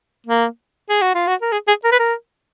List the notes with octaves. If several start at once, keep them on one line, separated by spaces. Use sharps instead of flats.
A#3
G#4
F#4
F4
F#4
A#4
G#4
G#4
A#4
B4
A#4